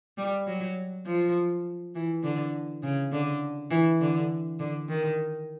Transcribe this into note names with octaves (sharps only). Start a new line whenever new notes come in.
G3
F#3
F3
E3
D3
C#3
D3
E3
D3
D3
D#3